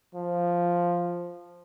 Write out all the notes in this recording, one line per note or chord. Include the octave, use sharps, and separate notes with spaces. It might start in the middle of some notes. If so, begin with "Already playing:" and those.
F3